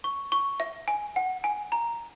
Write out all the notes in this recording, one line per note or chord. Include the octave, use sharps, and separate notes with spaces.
C#6
C#6
E5
G#5
F#5
G#5
A#5